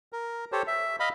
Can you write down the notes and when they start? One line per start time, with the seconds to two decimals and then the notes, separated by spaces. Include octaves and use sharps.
0.13 A#4
0.52 G4 A4 C5 C#5
0.67 E5
1.00 D#5 F5 B5